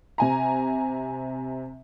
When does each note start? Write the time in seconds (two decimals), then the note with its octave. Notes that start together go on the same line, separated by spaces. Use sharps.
0.18 C3 G#5 A#5